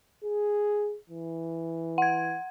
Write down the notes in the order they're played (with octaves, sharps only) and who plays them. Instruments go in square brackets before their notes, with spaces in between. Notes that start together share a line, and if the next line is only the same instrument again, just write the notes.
[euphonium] G#4
E3
[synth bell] F#5 G#6